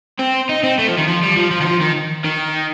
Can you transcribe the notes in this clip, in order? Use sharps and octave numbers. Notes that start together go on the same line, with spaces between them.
C4
D#4
C4
A3
F3
D#3
F3
G3
F3
F3
D#3
F3
D#3
D#3